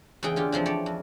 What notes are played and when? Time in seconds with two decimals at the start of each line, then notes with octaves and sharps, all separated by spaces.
0.23 E2 C#3 E3 G#4 G5
0.36 D3 F4 G4
0.52 C#3 E3 F3 C4
0.66 C#5 D5 G5 A5
0.86 F2